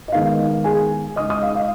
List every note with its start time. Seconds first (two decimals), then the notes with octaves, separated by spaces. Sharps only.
0.08 D#5
0.12 D#3 G#3 B3 D#4 F5
0.64 G#4 G#5
1.16 C#3 G#3 D#4 D#5 D#6
1.29 D#5 D#6
1.42 F5
1.55 F5